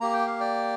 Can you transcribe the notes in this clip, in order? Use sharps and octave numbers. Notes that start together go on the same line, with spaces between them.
A#3 G4 A#5
G5
F5
D5 G5